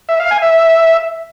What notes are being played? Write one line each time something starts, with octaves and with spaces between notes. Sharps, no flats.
E5
F5
G#5
E5